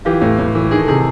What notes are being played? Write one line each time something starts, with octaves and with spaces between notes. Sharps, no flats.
E3 F4 G4
A2
A2
E3
D#3 G#4
A4
C3 G#4